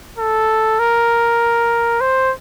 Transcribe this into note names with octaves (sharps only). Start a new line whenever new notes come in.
A4
A#4
C5